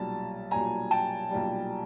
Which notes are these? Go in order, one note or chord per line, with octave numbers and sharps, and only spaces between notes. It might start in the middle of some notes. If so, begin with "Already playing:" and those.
Already playing: B1 A#2 G3 A5
B1 A#2 G3 G#5 A#5
G5 A5
B1 A#2 G3